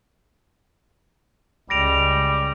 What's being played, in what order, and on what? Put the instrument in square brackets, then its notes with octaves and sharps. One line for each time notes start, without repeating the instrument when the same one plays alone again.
[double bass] C#2 [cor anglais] G3 [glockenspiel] A#6 D7 F7